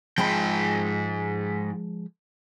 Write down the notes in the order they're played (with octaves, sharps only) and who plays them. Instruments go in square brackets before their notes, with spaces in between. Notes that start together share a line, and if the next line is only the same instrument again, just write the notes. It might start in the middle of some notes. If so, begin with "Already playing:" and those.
[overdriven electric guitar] G#2 G5 [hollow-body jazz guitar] F3 G#3 B5